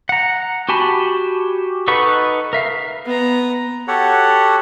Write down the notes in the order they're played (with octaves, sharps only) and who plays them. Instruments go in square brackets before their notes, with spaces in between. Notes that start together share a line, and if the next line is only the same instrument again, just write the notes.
[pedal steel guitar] F#5 A#5
F#4 G4 G#5 A5 B5
D#4 A4 B4 F#5 C#6
A#4 E5 F5
[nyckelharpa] B3 A#5
[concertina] F#4 G4 A4 C#5 F#5